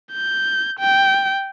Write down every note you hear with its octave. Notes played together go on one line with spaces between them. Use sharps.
G6
G5